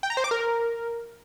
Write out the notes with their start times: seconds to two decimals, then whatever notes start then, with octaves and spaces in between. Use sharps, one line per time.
0.03 G5
0.10 A#5
0.17 C5
0.24 D6
0.31 A#4